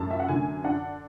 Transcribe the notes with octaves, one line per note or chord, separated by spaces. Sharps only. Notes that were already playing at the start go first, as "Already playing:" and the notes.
Already playing: F#2 A3 A5
E5
F#5
D3 G#5
D4 F#5